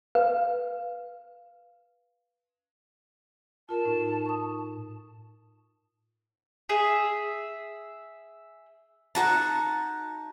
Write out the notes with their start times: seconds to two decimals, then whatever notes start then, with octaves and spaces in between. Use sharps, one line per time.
0.15 B4 F5
3.69 F4 A#4 A5
3.85 A2 D#4
4.26 C#6 D#6
6.69 G#4 E5
9.15 D#4 F#4 A5